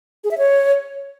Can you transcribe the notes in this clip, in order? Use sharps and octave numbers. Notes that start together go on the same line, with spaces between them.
G#4
E5
C#5